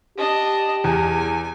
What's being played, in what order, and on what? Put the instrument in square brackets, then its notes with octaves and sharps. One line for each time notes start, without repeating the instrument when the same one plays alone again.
[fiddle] D4 D#5 [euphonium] G4
[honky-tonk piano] E2 [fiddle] G#5